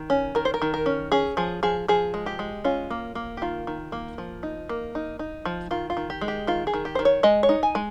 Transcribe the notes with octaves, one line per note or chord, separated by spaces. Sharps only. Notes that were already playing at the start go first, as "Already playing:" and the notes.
Already playing: D#3
C#4
D#3 A#4
C5
A#4
D#3
A#4
C#4
C#4 G#4
F3 G#4
F3 G#4
F3 G#4
G#3
G4
G#3
C#4 F4
A#3
A#3
G4
D#3 F4
D#3
A#3
F3
D#4
A#3
D#4
D#4
F3
D#3 F4
F4
D#3
G4
G#3
G4
D#3 F4
G#4
D#3
G4
D#3 C5
C#5
G#3 D#5
C#5
D#4
G#5
G#3